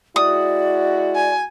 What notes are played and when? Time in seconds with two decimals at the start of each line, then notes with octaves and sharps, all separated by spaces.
0.16 G#3 E4 F#4 D5 D#6
1.16 G#5